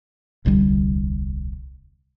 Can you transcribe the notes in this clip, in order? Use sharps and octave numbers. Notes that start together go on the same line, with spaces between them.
D#1 C2 D3 G3